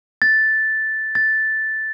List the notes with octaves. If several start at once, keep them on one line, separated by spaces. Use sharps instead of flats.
A6
A6